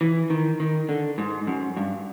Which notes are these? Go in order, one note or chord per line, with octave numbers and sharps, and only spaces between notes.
E3
D#3
D#3
D3
G#2
F#2
G2